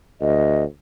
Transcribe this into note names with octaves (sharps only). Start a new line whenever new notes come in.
D2 D#5